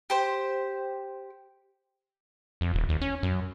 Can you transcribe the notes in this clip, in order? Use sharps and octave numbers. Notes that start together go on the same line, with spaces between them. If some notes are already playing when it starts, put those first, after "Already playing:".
G4 C5
F2
D#1
D#2
C#4
F#2